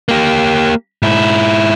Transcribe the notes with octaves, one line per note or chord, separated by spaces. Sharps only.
A#3 G4
G#2 E4